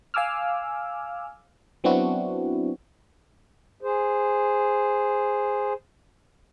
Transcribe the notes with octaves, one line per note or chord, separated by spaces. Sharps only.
F5 G#5 D6 E6 F6
F#3 B3 C4 D4 E4 F#4
G#4 C5